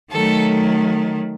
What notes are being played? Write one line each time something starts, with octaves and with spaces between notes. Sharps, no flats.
D#3 F#3 A3 A4